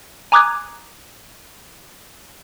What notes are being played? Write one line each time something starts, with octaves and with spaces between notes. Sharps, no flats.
G#5 A#5 D6 D#6 F#6 G#6